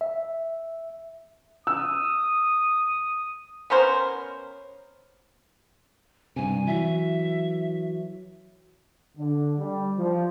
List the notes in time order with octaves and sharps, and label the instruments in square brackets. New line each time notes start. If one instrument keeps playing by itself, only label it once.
[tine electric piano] E5
[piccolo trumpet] D#6 [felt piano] E6
[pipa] B3 C#4 A#4 C5
[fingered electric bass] G2 C3 [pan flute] G#5
[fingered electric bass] E3 F#3 [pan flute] E5
[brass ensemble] D3
G3
F3